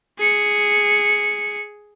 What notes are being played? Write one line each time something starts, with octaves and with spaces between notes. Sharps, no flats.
G#4 C#7